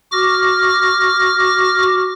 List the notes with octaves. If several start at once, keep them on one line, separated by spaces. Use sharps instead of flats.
F#4 D6 F6 A#6